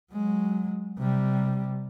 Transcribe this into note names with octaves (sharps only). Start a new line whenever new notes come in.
F#3 G#3
C3 G3